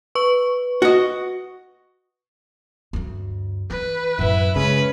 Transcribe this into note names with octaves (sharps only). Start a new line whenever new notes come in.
B4 C#6
F#4 D#5
D2 G2
E3 B4
F#2 A2 C#4 E4
C#3 G#3 A3 C#4 B4